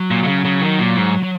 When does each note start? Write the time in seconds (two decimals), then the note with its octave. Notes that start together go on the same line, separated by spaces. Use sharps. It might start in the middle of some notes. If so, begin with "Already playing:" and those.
Already playing: F#3
0.11 A#2
0.23 A#2
0.27 C#3
0.45 C#3
0.62 D#3
0.79 A#2
0.97 G#2
1.23 F#3